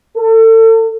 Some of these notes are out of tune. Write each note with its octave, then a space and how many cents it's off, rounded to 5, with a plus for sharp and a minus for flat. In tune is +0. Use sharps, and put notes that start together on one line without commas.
A4 +35